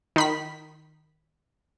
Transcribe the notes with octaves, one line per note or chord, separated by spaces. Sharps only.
D#3 B5 B6